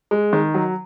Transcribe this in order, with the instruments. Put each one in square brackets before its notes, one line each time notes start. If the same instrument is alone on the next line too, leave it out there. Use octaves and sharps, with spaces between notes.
[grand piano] G#3
D#3
F#3